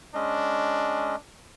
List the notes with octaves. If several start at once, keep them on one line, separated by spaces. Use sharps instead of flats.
G#3 C#4 D4 D#5